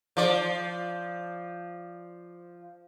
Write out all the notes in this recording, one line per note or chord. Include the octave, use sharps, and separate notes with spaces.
F3 D5